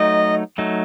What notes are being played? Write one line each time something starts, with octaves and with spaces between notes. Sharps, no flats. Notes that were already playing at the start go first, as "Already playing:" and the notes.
Already playing: F#3 A3 D#4 D#5
F#3 A3 D#4